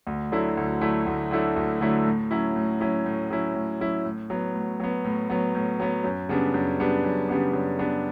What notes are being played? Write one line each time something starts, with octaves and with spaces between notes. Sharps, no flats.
D2
D3 F#3 A3 E4
D2
D3 F#3 A3 E4
D2
D3 F#3 A3 E4
D2
D3 F#3 A3 E4
A2
F#3 C#4 E4
A2
F#3 C#4 E4
A2
F#3 C#4 E4
A2
F#3 C#4 E4
A2
F#3 B3
A2
F#3 B3
A2
F#3 B3
A2
F#3 B3
F#2
C#3 G3 B3 D4
F#2
C#3 G3 B3 D4
F#2
C#3 G3 B3 D4
F#2
C#3 G3 B3 D4